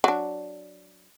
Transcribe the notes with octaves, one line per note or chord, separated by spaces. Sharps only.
F#3 D4